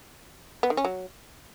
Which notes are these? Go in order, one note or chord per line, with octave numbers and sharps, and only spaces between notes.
B3
D#3
C#4
F#3